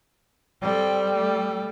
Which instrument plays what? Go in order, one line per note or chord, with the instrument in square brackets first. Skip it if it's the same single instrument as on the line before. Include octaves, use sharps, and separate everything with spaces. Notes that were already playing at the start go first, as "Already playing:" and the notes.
[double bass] G3 [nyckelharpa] C4 A4
[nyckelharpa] A3